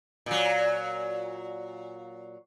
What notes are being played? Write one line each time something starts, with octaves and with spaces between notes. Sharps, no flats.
A#2 F#3